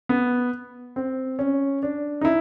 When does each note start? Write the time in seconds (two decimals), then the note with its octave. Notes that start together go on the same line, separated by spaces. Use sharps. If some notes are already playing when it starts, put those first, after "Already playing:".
0.09 B3
0.96 C4
1.39 C#4
1.83 D4
2.21 D#4
2.25 E4